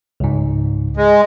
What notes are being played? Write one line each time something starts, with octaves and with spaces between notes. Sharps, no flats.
C#2 G#2
G#3